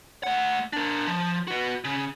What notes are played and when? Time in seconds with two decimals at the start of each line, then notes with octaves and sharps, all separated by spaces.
0.23 A3 F#5
0.73 D4 A#4
1.07 F3
1.48 F#4 B4
1.84 C#3